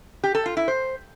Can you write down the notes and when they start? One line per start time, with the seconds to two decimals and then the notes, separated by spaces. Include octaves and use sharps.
0.24 G4
0.35 A4
0.46 F4
0.57 E4
0.68 C5